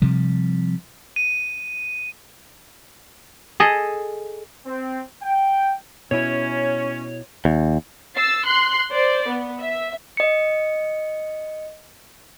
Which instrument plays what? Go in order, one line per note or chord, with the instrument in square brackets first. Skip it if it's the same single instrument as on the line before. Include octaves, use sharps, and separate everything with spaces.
[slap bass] C3 F3 G3
[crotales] D#7
[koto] G#4 A4 D#5
[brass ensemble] C4
G5
[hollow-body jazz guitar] B2 E4 [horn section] C#4 [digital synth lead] C#5
[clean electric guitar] D#2
[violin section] E6 A6 C7
C6 F#6 C7
C5 D5
B3
E5
[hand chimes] D#5 C#7